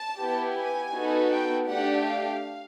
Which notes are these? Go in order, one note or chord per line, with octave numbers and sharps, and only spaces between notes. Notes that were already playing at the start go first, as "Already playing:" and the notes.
Already playing: A5
B3 E4 G4
G#5
B3 D#4 F#4 A4
G5
A3 D4 G4 F#5
F5